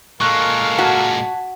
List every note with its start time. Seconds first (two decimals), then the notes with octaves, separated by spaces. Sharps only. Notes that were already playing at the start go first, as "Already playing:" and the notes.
0.20 A#2 G#3 A4 A#4 F5 C#6 F#6
0.79 F#4 A5 G#6 B6